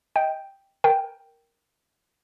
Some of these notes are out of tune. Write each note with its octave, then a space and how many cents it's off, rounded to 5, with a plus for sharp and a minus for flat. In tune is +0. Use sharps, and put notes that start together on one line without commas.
D#5 +20 G5 +0
A#4 +0 G5 +0